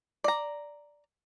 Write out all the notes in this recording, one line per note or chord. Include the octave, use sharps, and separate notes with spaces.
D5 A#5